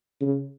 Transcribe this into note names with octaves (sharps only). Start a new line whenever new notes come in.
C#3